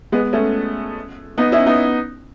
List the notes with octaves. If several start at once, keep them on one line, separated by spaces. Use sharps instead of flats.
G#3 B3
A3 C#4
B3 D#4
C#4 E4
B3 D#4